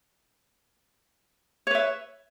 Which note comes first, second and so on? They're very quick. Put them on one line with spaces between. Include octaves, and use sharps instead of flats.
C#5 B4 E5